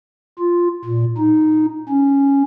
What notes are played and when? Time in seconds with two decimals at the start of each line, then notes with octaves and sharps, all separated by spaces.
0.39 F4
0.85 A#2
1.18 D#4
1.89 C#4